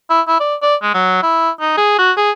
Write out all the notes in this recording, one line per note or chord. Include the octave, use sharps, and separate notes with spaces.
E4
E4
D5
D5
G#3
F#3
E4
D#4
G#4
F#4
G#4